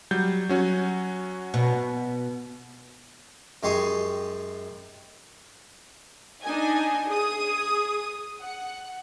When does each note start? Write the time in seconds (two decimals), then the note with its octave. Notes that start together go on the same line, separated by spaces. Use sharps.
0.11 F#3 G3 G6
0.49 F#3 C#4 F#4
1.54 B2
3.63 F#2 G#3 G4 C6 C#6 D#6
6.43 D4 D#4 D#5 G#5
7.09 G#4 D#6
8.41 F#5